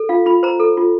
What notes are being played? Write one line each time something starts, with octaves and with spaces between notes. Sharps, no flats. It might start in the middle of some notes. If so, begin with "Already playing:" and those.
Already playing: A4
F4 F5
F4 B5
C5 A#5
A4
F4